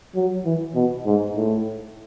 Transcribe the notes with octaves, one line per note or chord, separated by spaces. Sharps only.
F#3
E3
B2
G#2
A2